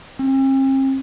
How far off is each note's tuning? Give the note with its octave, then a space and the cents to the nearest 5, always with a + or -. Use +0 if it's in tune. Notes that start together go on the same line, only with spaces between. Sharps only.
C4 +45